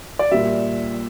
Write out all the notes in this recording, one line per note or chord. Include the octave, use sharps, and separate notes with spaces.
D5
A#2 G3 E5